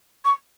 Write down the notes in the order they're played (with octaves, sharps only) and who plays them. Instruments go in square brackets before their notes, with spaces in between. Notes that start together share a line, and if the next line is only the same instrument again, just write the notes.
[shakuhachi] C#6